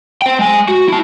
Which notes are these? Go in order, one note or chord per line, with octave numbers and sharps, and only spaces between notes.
C5 G5
G#3 G#5
F#4
E4 A5